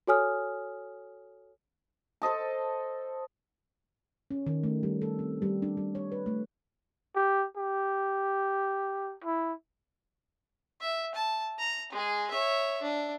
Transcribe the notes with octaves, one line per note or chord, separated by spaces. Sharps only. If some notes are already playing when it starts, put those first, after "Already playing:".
F#4 A4 C#5 G#5 D#6 F6
A4 C5 D#5 A5
C#4
D#3
A3
G3
A4
C4
G3
D4
G3
C#5
B4
A3
G4
G4
E4
E5
A5
A#5
G#3 G#4
C#5 E5
D4